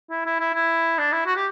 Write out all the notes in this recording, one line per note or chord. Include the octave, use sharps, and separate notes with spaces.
E4
E4
E4
E4
D4
E4
F#4
G4